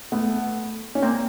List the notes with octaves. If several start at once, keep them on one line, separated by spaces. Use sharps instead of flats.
A3 B3
C#4
A#3 C4